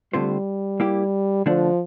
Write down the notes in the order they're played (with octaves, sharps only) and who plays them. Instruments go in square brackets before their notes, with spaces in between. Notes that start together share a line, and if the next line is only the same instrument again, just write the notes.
[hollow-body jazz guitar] D3 A3 C4 F4 C5 [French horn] G3
[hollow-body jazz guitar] A#3 E4 G4
[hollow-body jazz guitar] D3 A3 D4 [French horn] F3